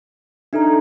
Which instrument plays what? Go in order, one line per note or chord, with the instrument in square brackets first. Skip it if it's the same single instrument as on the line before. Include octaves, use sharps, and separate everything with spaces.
[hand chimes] D4 D#4 A4 [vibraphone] E5 A#5